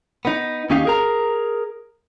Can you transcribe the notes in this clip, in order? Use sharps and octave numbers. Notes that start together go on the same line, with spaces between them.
B3 D#4
D#2 C#4 D#4 G4 F5
G#4 A#4 A#5